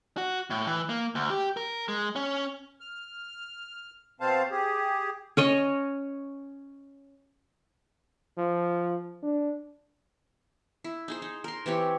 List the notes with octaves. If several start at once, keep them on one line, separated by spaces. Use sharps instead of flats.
F#4
A2
E3
A#3
D2
G4
A#4
G#3
C#4
F6
B2 C4 C5 F5 A5
G4 G#4
C#4 C#5 D#5
F3
D4
E4
D#4 G#4 C5
D#4
A#4 C6
E3 C4 G4 C#5